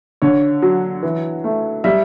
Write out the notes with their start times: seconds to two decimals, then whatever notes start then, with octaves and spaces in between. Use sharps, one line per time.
0.22 D3 C#5
0.62 F#3
1.03 E3
1.44 A3
1.84 G3 E5